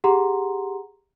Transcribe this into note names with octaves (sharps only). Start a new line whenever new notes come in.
G4 G#4 F#5 A#5 C6